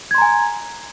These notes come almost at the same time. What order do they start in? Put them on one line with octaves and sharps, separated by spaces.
G#6 C6 A#5 G#5